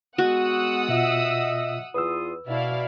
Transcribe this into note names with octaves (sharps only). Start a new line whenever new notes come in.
G#3 B3 F#4 F#5 D#6 E6
B2 F4 D#5 E5
E2 F4 B4 D#6 E6
B2 E4 D5 F5